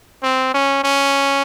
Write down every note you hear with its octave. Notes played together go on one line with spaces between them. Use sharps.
C4
C#4
C#4